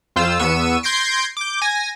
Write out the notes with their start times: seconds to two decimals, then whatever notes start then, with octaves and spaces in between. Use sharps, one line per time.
0.16 F2 F4 C5 E6
0.39 E2 B3 C#6 E6 D#7
0.83 C6 G6 G#6 A#6 C7 D7
1.37 D6 G6
1.62 G#5 A#6